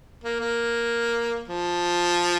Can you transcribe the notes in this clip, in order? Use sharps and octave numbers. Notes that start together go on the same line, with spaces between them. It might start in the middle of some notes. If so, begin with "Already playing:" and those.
A#3
A#3
F3